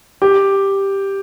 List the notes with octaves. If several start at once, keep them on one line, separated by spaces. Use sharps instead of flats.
G4